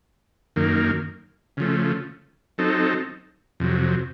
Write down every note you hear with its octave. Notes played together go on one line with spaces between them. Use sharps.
F#2 D#3 A#3
C#3 F3 A3
F#3 C4 D#4 A4
F2 C3 F#3